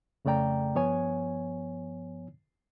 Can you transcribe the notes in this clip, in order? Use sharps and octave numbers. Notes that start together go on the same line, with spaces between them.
F2 C#3 A3 D5 G5 A#5
G2 F3 B3 C#5 G#5